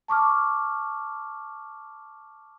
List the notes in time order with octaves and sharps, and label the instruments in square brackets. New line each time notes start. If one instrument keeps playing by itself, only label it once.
[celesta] A5 C#6 D6 F6